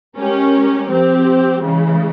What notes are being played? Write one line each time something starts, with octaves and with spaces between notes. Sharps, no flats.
G#3 C#4 G4 A#4
F3 C4 G4
C#3 E3 G#3